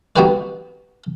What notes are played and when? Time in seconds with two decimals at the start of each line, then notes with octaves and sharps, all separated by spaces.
0.16 B3 D#4 F#4 G4 B4 D5